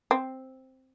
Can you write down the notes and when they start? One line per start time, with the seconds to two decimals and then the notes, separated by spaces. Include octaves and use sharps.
0.11 C4